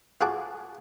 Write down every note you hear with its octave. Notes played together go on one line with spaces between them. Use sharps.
F4 F#4 G#4 A5 D6